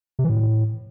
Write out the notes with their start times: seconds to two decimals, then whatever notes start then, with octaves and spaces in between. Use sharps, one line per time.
0.19 C3
0.24 E3
0.30 A2